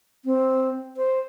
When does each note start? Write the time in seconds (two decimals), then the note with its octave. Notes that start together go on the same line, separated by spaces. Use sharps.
0.25 C4
0.97 C5